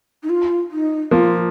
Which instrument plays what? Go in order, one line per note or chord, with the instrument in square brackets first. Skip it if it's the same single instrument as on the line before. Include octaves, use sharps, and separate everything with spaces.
[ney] D#4
F4
D#4
[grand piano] F3 A#3 [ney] F4